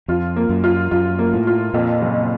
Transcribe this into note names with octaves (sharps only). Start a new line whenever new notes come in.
F2 F4
A#3
F#2
F4
F#2 F4
A#3
A2
F4
F2 A#2
F#1